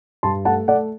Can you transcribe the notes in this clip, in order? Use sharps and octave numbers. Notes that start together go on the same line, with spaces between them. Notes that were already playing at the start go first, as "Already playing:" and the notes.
G2 A5 C6
A3 F#5 A5
A3 D5 F#5